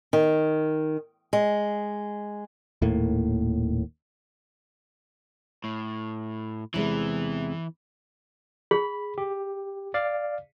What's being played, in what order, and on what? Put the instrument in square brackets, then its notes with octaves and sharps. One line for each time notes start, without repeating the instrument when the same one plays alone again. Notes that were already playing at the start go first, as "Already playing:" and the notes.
[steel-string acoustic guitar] D#3
G#3
[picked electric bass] D#1 D#2 A2 A#3
[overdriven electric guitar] A2
[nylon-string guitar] E2 C3 G#3 [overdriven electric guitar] E3
[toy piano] G#4 [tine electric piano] B5
[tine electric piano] G4
D5 F5